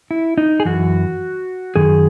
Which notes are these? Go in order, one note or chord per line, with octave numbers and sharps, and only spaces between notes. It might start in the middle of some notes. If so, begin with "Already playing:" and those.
E4
D#4
G#4
F#2 E3 F#4
F#2 D#3 G#4